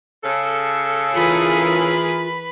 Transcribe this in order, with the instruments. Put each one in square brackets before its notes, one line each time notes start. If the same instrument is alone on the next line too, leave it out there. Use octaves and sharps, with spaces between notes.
[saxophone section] C#3 A4
[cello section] E3 G#4 A#4 [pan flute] F4 [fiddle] B4 B5